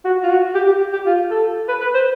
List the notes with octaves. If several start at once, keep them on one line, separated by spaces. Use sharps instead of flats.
F#4
F4
F#4
G4
G4
G4
F4
A4
B4
B4
C5